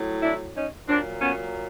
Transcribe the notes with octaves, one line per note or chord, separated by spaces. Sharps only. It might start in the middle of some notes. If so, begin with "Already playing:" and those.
Already playing: A2 F#3
D4 E4
C#4 D#4
A#2 F#3 C4 D4
B3 C#4